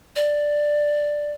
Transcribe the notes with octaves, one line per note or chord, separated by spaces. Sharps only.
D5